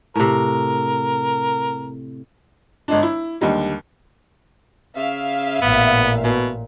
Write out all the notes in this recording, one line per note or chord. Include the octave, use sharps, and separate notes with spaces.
A2 C3 A#4
G1 G#3 D4
E4
D#2 D3 G3 G#3
C#3 E5 F5
A1 A#2 B3
B2